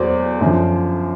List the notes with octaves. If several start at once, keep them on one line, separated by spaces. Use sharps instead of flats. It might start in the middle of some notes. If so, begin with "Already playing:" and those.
Already playing: E2 F#3 C5 D5
F#2 D3 F3